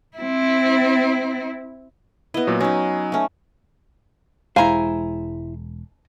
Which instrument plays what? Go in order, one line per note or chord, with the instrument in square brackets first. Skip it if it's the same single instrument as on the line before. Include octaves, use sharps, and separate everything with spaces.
[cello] C4 E4
[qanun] B3 D#5 [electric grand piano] E4
[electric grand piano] A#2 F#3
[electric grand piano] F#3 [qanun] C#4 D#4
[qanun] A3 C#4
[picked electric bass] E1 G#3 [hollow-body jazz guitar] E4 C5 [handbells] F5 [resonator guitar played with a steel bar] G#5 A#5